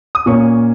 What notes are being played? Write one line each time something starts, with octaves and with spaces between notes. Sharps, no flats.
D#6
A#2 A#3 C#4 C#6